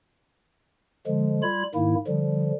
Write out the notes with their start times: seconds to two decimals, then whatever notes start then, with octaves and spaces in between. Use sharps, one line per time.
1.07 D3 F3 G#3
1.42 G3 F4 B5 G#6
1.75 G#2 D#3 A#3 E4
2.07 D3 F3 G3